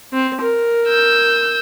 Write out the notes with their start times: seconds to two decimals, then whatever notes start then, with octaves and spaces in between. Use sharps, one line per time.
0.12 C4
0.41 A#4
0.88 E6 G6